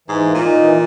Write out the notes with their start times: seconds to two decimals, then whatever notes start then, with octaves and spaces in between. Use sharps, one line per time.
0.08 G#2 E3
0.26 A#3
0.35 A#2
0.43 D#4
0.61 E3